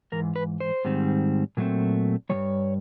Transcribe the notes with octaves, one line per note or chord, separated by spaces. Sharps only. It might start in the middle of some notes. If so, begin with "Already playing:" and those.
G#2 E3 A#4
B4
C5
G#2 D#3 G3 C4
A#2 F#3 A3 C4
G2 E3 G3 C#5